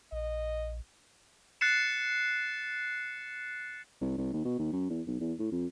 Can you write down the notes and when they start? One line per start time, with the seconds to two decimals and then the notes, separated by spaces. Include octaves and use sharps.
0.12 A#1 D#5
1.61 F#6 A6 C7 C#7 E7
4.01 C2
4.18 C2
4.33 D#2
4.45 B2
4.59 D#2
4.73 F#2
4.90 E2
5.07 B1
5.21 E2
5.40 A2
5.52 F2